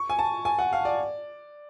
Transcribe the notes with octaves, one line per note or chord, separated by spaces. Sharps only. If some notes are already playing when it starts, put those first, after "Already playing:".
Already playing: C#6
G#5
A5
G#5
F#5
F5
D5